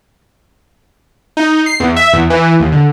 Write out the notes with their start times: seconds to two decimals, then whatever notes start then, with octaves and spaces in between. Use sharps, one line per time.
1.37 D#4
1.66 C7
1.80 E2
1.96 E5
2.13 E2
2.30 E3
2.60 D#2
2.72 D3